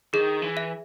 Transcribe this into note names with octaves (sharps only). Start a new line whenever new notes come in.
D#3 G#4
E3
E5